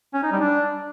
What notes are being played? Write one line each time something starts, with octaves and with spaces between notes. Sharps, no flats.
C#4
D#4
G3
D4